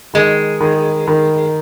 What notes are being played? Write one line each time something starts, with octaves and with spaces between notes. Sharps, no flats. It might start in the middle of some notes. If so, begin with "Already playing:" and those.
D#3 G#3
D#3
D#3